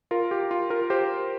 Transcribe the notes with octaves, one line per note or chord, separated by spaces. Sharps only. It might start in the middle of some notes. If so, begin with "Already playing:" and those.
F4 A#4
G4
F4
F4 A#4
G4 C5